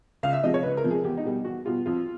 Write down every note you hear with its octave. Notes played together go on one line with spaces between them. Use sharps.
C#2 F5
E5
C3 F3 G#3 D#5
C#5
C#2 B4
A#4
C3 F3 G#3
G#4
E2 G4
D#4
B2 G3
E2 F#4
B2 G3 F4
F2 F4